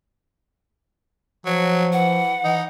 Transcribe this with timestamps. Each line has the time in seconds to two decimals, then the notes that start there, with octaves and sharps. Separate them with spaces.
1.46 F3 F#3
1.93 E3 F#5
2.44 E3 D#4